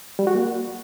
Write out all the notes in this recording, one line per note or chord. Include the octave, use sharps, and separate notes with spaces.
G3
F#4
A#3